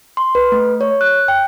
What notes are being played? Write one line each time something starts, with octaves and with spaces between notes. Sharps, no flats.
C6
B4
A3
C#5
F#6
G5